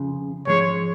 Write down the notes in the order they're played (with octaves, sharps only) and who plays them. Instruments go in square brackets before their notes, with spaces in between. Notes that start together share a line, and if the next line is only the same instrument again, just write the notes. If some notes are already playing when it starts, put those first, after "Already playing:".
Already playing: [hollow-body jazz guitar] F2 C#3 F3
[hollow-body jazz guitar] G#2 F3 G#3 [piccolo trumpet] C#5